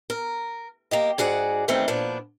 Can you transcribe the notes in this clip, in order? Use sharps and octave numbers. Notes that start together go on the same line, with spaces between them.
A#4
A#3 G4 D#5
G#2 F#4 G#4 D5 F#5
D#3 E3 G3 A3 C4 D4
A#2 F3 B3 D4